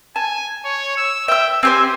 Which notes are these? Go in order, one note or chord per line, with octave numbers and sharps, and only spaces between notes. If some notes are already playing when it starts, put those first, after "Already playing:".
G#5 A5
C#5
E6
E5 G5 E6
C4 G4 C5 G#5